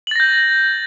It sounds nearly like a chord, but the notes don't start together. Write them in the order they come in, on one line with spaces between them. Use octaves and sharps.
F#7 A6 A#6 G6